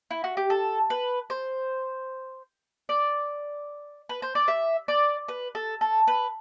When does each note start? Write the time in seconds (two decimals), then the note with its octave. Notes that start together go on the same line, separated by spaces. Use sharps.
0.11 E4
0.24 F#4
0.37 G4
0.50 A4
0.90 B4
1.30 C5
2.89 D5
4.09 B4
4.22 C5
4.35 D5
4.48 E5
4.88 D5
5.28 B4
5.55 A4
5.81 A4
6.07 B4